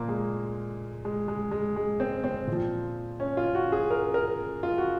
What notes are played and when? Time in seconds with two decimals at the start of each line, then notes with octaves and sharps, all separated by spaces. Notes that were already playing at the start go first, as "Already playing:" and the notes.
Already playing: A#2 F3 A#3
0.09 G#3
1.05 G#3
1.28 G#3
1.51 G#3
1.76 G#3
2.00 C4
2.24 C4
2.47 A#2
2.52 F3
3.20 C#4
3.37 F4
3.55 F#4
3.72 G#4
3.91 A#4
4.14 A#4
4.63 F4
4.78 F#4